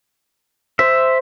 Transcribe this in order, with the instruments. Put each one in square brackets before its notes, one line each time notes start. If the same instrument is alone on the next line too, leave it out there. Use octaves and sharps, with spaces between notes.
[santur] C5 [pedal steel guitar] E5